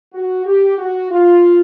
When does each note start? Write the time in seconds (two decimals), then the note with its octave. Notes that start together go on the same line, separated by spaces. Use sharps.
0.14 F#4
0.46 G4
0.78 F#4
1.11 F4